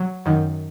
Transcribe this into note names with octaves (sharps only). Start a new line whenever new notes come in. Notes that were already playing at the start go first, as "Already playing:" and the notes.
Already playing: F#3
F#2 D#3